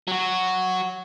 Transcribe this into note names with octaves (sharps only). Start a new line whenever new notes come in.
F#3 F#4